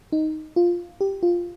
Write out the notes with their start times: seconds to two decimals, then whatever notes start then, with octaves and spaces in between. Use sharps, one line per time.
0.12 D#4
0.56 F4
1.01 G4
1.23 F4